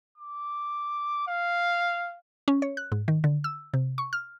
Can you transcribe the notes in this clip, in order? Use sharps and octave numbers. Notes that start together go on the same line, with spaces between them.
D6
F5
C#4
C#5
F#6
G#2
D#3
D3
E6
C3
C#6
F6